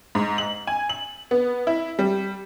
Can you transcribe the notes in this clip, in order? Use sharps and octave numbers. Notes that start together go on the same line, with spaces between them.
G#2
F#7
G#5
F#7
B3
E4
G3